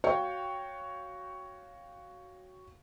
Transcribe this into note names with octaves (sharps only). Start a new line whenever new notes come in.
F#4 C#5 F5 G5